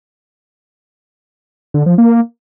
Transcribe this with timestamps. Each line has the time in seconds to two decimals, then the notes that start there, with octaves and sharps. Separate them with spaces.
1.74 D3
1.86 F3
1.98 A#3